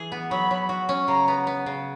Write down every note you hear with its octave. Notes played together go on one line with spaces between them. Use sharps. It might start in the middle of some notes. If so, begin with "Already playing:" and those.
Already playing: E3 G#4
B3
F#3 B5
F#3
F#4
C#4
C#3 A#5
B3
B3
C#3